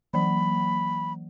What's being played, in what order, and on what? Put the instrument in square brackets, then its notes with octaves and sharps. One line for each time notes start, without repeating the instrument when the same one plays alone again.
[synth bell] E3 F#3 A#3 [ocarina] B5